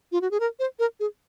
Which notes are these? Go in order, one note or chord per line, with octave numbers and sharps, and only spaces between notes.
F4
F#4
G#4
A#4
C5
A#4
G#4